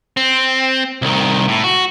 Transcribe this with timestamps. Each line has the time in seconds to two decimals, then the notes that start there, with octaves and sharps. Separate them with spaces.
0.17 C4
1.02 C2 D#3
1.48 A2
1.64 F#4